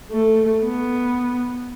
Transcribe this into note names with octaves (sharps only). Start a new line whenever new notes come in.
A3
B3